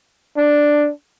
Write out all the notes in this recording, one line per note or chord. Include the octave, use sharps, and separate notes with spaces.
D4